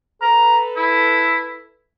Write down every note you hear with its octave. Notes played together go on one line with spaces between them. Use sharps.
A4 B4 A#5
E4